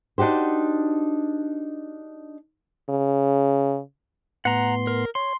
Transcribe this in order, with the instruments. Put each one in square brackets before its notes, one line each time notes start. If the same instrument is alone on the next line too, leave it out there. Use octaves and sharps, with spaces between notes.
[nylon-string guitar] D4 D#4 F#4 G4 C5
[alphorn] C#3
[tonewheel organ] A2 B3 C6 [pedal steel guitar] F#5 A#5
[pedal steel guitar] A#4
[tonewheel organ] C#5 [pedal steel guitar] C6